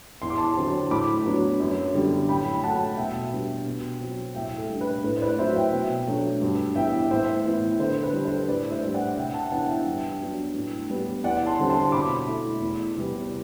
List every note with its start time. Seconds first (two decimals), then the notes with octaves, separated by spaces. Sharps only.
0.22 E2 C6
0.30 D6
0.38 A5 C6
0.56 D3 F#3 C4
0.91 A2 B5 D6
1.26 F#3 B3 D4
1.60 F#2
1.94 D3 G3 B3 D4
2.29 A2 G5 B5
2.54 B5
2.63 F#3 A3 F#5 A5
2.97 B2 E5 G5
3.31 G3 B3 D4
3.66 B2
4.01 F#3 C4
4.35 A2 E5 G5
4.58 A4
4.70 G3 D4
4.81 B4
5.04 A2 B4
5.17 C5
5.22 B4 D5
5.38 F#3 C4 E4 C5 E5
5.55 E5 G5
5.73 B2
6.07 F#3 A3 D4
6.41 G2
6.76 E3 B3 E5 G5
7.11 A2 C5 E5
7.45 E3 B3 E4
7.79 D3 A4 C5
8.03 B4
8.13 G3 D4
8.25 A4 C5
8.48 A2 B4 D5
8.71 C5 E5
8.83 G3 D4
8.94 D5 F#5
9.17 C3 E5 G5
9.34 F#5 A5
9.51 E3 B3 D4 F#5 A5
9.68 E5 G5
9.86 G2
10.21 F#3 B3 D4
10.54 A2
10.90 G3 B3
11.23 E2 D5 F#5
11.46 A5 C6
11.59 D3 G3 C4
11.69 A5 C6
11.92 B2 B5 D6
12.27 A3 E4
12.62 E2
12.96 C3 G3 B3